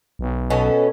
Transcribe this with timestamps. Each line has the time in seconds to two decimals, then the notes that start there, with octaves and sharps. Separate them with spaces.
0.19 B1
0.50 B2 C#4 A4